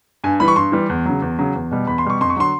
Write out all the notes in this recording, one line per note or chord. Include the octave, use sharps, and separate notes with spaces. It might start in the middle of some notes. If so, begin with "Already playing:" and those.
G2 G#5
E3 G3 B5
C#6
G2 C6
E3 G3
E2
C#3 F#3
E2
C#3 F#3
E2
B2 G3
E2 B5
C6
B2 G3 C#6
F2 C6
C#6
D3 F#3 C6